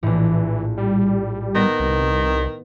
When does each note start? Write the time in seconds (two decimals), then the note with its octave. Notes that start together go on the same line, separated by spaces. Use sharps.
0.03 A#1 A2 E3
0.77 G3
1.55 D#3 B3 A#6
1.80 C2